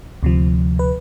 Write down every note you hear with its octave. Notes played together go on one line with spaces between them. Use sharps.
D2 C3 F3
B4